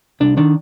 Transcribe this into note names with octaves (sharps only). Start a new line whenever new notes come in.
C2 D4
D#3 D4